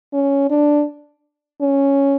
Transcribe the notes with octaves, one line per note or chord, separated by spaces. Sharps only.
C#4
D4
C#4